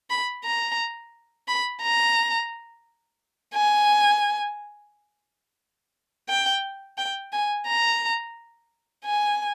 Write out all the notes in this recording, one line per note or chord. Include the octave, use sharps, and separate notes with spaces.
B5
A#5
B5
A#5
G#5
G5
G5
G#5
A#5
G#5